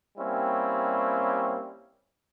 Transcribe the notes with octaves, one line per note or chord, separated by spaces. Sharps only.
G3 A#3 C4 C#4 E4